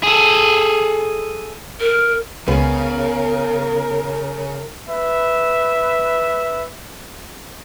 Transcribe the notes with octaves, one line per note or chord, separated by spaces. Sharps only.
G#4 A4
A#4
C#2 C#3 B3 C#4 A#4
B4 E5